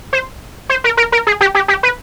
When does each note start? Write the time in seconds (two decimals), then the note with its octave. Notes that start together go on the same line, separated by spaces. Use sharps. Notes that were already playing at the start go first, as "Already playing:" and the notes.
0.13 C5
0.69 C5
0.84 A#4
0.97 A#4
1.12 A#4
1.27 G#4
1.41 G4
1.55 G4
1.68 G4
1.83 B4